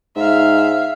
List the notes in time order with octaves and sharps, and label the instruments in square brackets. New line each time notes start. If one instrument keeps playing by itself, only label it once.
[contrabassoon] G#2 [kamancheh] E5 F5